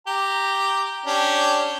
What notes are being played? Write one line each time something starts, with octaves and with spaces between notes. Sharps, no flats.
G4 A#5
C#4 D4 G4